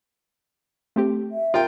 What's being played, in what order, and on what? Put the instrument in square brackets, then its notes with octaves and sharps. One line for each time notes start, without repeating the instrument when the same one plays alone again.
[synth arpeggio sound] A3 C4 G4
[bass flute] E5
[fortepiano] F4 A#4 G5